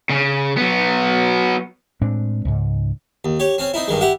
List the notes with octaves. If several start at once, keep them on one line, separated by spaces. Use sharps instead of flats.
C#3
F#3 B3
A2 G#3 C4 D4
C#2 G#2
D#2
G4 C#5
C4 C#4
C4 D#4 E4
G2 D#3 G#3
E4 G4 F#5